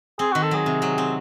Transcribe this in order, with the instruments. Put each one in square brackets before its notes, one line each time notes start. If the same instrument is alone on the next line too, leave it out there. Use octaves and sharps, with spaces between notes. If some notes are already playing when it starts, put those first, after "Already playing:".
[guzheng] C4 [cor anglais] G#4
[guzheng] D#3 [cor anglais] F#4
[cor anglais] A4
[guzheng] F#3 [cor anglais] G#4
[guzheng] C3
F#3
C4